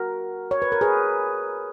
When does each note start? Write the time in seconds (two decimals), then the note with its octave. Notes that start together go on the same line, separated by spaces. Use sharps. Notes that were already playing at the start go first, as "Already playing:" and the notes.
Already playing: F#4 A#4
0.51 C#5
0.62 B4
0.72 A#4
0.81 G#4 B4